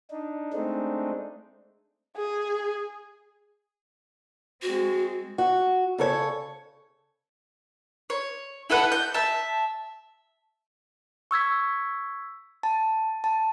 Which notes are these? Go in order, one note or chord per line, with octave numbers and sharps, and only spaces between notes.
D4 D#4
G#3 A3 C4 D4 D#4
G#4
G#3 C4 F#4
F#4
C#3 A4 C#5
C#5
E4 A4 B4 F#5
G6
E5 A5
C#6 E6 G#6 B6
A5
A5